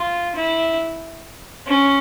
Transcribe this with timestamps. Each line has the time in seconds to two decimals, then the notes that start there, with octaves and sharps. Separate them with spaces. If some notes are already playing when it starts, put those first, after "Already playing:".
Already playing: F4
0.36 E4
1.67 C#4